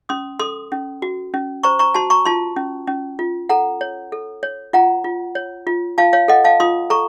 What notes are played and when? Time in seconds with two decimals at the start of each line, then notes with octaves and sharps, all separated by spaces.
0.09 C#4 C6 D#6
0.40 A4 C6 D#6
0.72 C#4
1.02 F#4
1.34 C#4
1.63 C5 A#5 C#6
1.79 A#5 C#6
1.94 F#4 A5 C6
2.10 A#5 C#6
2.25 F4 A5 C6
2.56 C#4
2.87 C#4
3.19 F4
3.49 A4 F#5 A#5
3.81 C#5
4.12 A4
4.43 C#5
4.73 F4 F#5 A#5
5.04 F4
5.35 C#5
5.67 F4
5.98 F4 F5 A5
6.13 C#5 F5
6.28 A4 D#5 F#5
6.44 F5 A5
6.60 F4 C6 D#6
6.90 A4 A#5 C#6